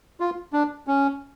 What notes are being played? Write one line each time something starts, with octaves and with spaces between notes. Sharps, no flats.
F4
D4
C#4